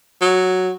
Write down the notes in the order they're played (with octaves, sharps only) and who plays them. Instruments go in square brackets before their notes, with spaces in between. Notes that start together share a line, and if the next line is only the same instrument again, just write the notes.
[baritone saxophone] F#3